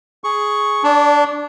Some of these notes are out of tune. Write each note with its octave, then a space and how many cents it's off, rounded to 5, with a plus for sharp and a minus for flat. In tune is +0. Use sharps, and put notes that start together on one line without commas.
G#4 +10 C#6 +0
D4 +0 D5 -30